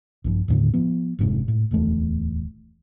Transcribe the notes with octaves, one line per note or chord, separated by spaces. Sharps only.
A#1 G2 F3
D#2 A2 D3
F3 B3
F1 G#2 C3
A2
D1 E2 E3 A3